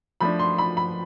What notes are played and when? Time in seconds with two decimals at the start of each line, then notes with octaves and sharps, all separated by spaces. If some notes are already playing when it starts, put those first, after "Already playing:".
0.21 F3 A3 D4 B5
0.39 C6
0.58 B5
0.77 B5